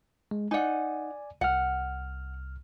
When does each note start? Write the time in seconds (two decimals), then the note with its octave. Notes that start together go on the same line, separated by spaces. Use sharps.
0.31 G#3
0.51 D#4 D5 F#5 G#5
1.41 C2 F#5 F6